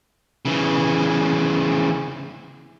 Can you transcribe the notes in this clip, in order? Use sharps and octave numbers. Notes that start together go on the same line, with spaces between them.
C#3 E3